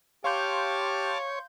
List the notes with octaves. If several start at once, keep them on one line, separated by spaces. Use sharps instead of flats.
G4 C#5 F5 A5 C6 D6 F6 G6